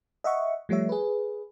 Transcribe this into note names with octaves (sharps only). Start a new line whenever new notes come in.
D#5 E5 F#5 C#6
F3 G3 A3 C#5 E5
G#4 B4